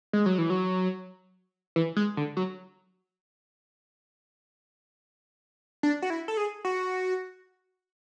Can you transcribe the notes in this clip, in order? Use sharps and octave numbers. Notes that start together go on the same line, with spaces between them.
G#3
F#3
E3
F#3
E3
G#3
D3
F#3
D4
F#4
E4
A4
G#4
F#4